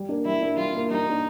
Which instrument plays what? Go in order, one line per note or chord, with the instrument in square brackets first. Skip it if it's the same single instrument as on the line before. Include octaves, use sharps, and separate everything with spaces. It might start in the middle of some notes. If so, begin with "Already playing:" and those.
Already playing: [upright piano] G3
A#3 D4
[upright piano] G3 [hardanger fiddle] E4
[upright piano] A#3 D4
[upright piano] G3 [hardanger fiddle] F4
[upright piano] A#3 D4
[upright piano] G3 [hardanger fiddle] D#4
[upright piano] A#3 D4